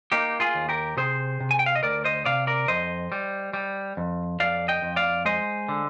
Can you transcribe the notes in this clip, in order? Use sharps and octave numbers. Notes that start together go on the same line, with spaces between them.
A#3 D#4 G4
F4 G#4
D#2
G4 A#4
C3 G#4 C5
C3
G#5
G5
F5
D#5
D2 A#4 D5
C5 D#5
C3 D5 F5
A#4 D5
F2 C5 D#5
G3
G3
F2
F2 D5 F5
D#5 G5
F2
D5 F5
G#3 C5 D#5
D3